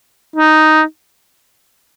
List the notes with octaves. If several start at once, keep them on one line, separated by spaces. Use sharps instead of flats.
D#4